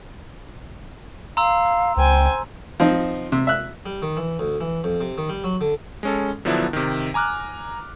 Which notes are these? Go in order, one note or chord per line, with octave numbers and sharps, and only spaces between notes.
F5 A#5 C6 E6
C#2 C5 G5 G#5
F3 C4 D#4
C3
E5 F#6
G3
D#3
E3
D2
E3
F2
C3
D#3
G3
F#3
D3
G#3 C#4 A4
D3 F3 F#3 B3 D4 E4
C3 D#3
G#5 A#5 D6 F6 F#6